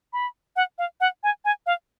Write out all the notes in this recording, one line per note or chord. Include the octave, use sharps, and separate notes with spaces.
B5
F#5
F5
F#5
G#5
G#5
F5